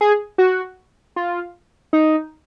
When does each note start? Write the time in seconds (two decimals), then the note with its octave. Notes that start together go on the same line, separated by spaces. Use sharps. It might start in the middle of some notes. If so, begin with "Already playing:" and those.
0.01 G#4
0.38 F#4
1.16 F4
1.93 D#4